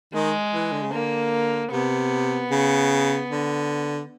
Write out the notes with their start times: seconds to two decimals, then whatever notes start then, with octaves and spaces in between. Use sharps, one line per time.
0.13 D#3 G#3
0.54 E3
0.73 D3
0.83 C#3
0.92 D3 A#3
1.72 C3 B3
2.51 C#3
3.31 D3